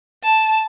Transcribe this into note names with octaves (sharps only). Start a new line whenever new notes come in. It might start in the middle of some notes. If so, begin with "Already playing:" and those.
A5